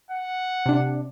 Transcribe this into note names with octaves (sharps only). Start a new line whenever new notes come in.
F#5
C3 D4